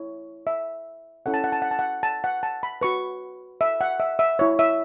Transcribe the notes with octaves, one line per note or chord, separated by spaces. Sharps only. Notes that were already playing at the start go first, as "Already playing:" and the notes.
Already playing: E4 C#5
E5
C#4 E4 A4 C#5 F#5
A5
F#5
A5
F#5
A5
F#5
A5
F#5
A5
B5
F#4 B4 C#6
E5
F#5
E5
E5
E4 C#5
E5